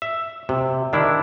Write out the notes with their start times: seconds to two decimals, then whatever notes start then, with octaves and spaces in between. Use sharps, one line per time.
0.02 E5
0.49 C3
0.93 D#3 D4 E4